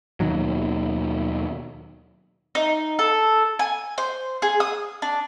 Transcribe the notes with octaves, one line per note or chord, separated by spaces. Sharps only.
D#2 B2 D#3 F#3
D#4
A4
G#5
C5
G#4
D#6
D4